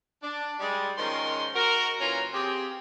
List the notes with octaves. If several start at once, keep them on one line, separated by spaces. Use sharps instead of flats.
D4
G3 G#3
D#3 F3 G#3 C#4 A#4 C6
F#4 A#4
A#2 E3 C#4 F4 A#5
C4 G4 G#4